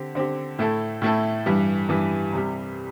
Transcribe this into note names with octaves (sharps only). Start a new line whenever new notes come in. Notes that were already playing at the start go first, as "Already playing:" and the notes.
Already playing: D3 C4 G4
D3 C4 G4
A2 A3 E4 A4
A2 A3 E4 A4
G2 E3 G3
G2 E3 G3
C2 C3 G3